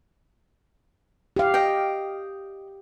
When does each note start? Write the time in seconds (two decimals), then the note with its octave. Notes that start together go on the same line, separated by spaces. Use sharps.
1.36 G4 F5
1.54 D#5 G5